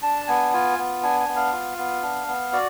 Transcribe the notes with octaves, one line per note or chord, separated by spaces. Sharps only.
D4 A5
B3 G#5
F4 G#5
B3
D4 G#5
G#5
B3
F5
F4
B3
D4
B3
F#4 D5